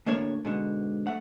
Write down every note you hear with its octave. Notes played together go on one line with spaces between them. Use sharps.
D2 A2 A#3 D4 C#5
G#2 B2 D3
A3 F#5